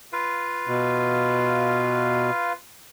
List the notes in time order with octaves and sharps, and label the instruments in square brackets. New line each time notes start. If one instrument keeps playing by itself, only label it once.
[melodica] F4 B4 F5
[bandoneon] B2